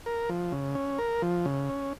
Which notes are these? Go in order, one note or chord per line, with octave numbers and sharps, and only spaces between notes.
A#4
F3
C#3
C#4
A#4
F3
C#3
C#4